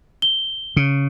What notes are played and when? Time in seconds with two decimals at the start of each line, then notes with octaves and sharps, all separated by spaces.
0.22 G7
0.77 C#3